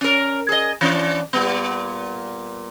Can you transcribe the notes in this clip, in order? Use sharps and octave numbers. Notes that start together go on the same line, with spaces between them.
C#4 A#4
G#4 D#5
E3 C#4 D4
A#2 G3 B3